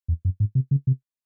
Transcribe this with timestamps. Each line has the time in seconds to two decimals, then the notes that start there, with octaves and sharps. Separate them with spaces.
0.08 E2
0.25 F#2
0.40 G#2
0.55 C3
0.71 C#3
0.87 C3